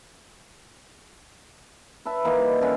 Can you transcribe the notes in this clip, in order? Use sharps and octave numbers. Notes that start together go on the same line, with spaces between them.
B4 E5 A5
D#3 E3 A#3 D#4
G3
D3 C#4 D4